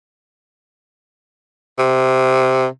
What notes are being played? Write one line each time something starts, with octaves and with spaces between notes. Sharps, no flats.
C3